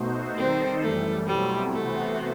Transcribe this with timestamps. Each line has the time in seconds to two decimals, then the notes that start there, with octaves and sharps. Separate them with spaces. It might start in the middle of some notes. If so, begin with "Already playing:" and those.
Already playing: B2 A3 D#4 F#4 C5
0.37 D#3 G3 C4 D#4 A4 C5
0.82 F#2 E3 G3 A3
1.27 B2 F#3 G3 A3 C4 E4
1.72 C3 E3 A3 B3 F#4 C5